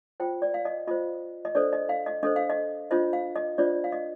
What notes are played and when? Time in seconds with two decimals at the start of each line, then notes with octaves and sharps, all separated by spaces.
0.20 F4 C5 G5
0.42 D5
0.54 F5
0.65 D#5
0.88 F4 C5 D#5
1.45 D#5
1.55 D4 A4 C5 D5
1.73 D#5
1.89 F5
2.06 D#5
2.23 D4 A4 C5 D#5
2.36 F5
2.50 D#5
2.91 D4 F4 C5 D#5
3.13 F5
3.36 D#5
3.58 D4 F4 C5 D5
3.84 F5
3.92 D#5